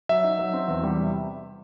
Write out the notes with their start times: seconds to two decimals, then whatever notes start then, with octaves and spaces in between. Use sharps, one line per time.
0.09 F#3 E5
0.24 D#4
0.39 F#3
0.53 C4
0.68 E2
0.83 G3
0.98 C3